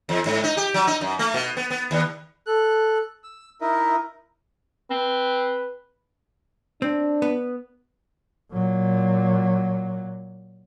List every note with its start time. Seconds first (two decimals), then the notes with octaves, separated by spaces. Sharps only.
0.09 E2
0.26 G#2
0.44 D#4
0.57 G4
0.74 F#3
0.87 D#4
1.01 F#2
1.19 A3
1.34 B2
1.57 B3
1.71 B3
1.91 D#2
2.46 A4 F#6
3.24 E6
3.61 D#4 E4 A#4 D#5 E5
4.91 C4 B4
6.82 C4 D4
7.22 B3
8.52 A#2 F#3